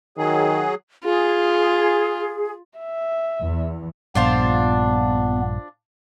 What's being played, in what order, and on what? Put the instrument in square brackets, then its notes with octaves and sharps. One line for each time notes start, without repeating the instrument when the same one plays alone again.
[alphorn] D#3 [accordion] F#3 G#4
[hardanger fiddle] F4 [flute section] G#4
[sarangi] E5
[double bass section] E2
[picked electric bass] A#1 G2 [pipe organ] B3 [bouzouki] D4 F4 C5